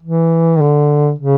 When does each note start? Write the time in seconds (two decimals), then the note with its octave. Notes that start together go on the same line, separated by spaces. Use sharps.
0.03 E3
0.56 D#3
0.61 D3
1.19 C#3